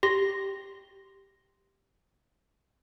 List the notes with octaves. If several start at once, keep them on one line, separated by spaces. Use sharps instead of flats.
G4 C6 A#6